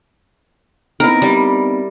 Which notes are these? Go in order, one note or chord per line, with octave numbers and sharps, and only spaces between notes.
B3 C4 D#4 E4 A#4
G3